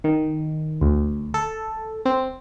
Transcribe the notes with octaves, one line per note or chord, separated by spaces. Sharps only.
D#3
D2
A4
C4